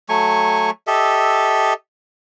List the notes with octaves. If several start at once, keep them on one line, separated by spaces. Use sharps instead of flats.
F#3 A3 G#5 C#6
G4 A4 D#5 E5